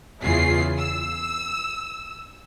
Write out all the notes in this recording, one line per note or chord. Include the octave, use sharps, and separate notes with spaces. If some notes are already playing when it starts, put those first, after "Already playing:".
E2 C#3 E4 F4 G#4 C7
E6